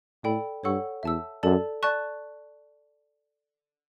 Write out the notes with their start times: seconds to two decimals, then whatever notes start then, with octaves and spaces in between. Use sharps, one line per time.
0.24 A2 A4 D5 G5 B5
0.64 G2 A4 C#5 F#5 C#6 E6
1.03 E2 E5 A5 E6
1.43 F#2 A4 D5 A5
1.83 D5 A5 C#6 F#6